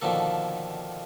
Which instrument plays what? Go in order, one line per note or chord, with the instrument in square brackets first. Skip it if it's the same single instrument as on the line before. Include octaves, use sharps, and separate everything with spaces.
[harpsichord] B2 D3 D#3 F3 A#3 A4